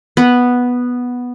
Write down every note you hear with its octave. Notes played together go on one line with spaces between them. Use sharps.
B3